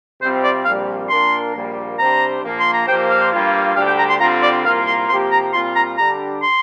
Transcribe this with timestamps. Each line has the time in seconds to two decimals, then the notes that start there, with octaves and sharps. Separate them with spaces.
0.21 C3 G3 C4 F4 C5
0.44 D5
0.65 A#1 A#2 G3 C4 F5
1.10 A#2 A#3 D4 A#4 C6
1.54 A#1 A#2 G3 A#3
1.99 C3 G3 D4 G4 C5 A#5
2.43 A#1 A#2 F3 A#3
2.60 C6
2.73 A#5
2.87 A#2 F3 A#3 G4 C5 G5
3.10 F5
3.32 G2 G3 A#3 F4
3.76 D2 D3 G3 D4 G4 F5
3.87 G5
3.99 A#5
4.09 C6
4.20 D3 G3 C4 F4 A#5
4.43 D5
4.65 C2 A#2 A#3 F4 A#4 F5
4.87 C6
5.09 C3 F3 A#3 G4 C6
5.32 A#5
5.53 A#2 G3 C4 F4 C6
5.76 A#5
5.98 D3 G3 D4 G4 A#5
6.42 C6